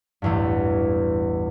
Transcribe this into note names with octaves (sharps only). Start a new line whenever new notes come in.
A1 E2 G2